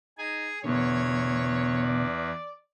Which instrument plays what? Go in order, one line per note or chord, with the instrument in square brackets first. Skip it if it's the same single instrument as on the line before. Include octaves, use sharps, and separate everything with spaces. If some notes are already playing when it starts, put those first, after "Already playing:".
[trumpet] D#4 [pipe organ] G#4 G#5
[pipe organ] E2 [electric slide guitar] B2 D3 [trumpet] C#5
[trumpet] D5